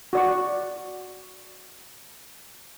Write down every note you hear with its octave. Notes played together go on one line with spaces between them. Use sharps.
F#4 D5 C#6